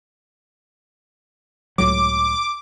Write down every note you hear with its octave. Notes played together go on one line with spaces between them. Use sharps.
C#2 A2 F#3 D6